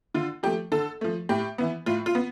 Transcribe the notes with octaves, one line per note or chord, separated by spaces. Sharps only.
D3 F4
F3 A3 G4
D3 A4
F3 A3
A2 G4
E3 B3
A2 F4
F4
B3